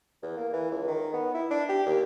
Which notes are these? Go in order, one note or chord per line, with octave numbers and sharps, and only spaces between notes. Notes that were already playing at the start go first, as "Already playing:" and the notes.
E2
A#3
E3
C#2
D#3
B3
E4
D4
G4
D#2